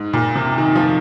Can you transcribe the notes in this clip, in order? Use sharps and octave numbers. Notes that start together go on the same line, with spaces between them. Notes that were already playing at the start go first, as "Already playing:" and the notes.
Already playing: G#2
A#2
C3
D#3
F3